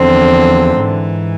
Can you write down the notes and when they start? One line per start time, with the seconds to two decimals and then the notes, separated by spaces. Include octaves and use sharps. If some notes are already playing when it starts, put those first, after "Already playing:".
Already playing: E2 D3 F3 C4
0.80 G#2 E3